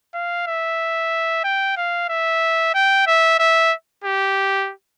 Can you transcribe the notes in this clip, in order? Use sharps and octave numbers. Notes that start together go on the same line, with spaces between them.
F5
E5
G5
F5
E5
G5
E5
E5
G4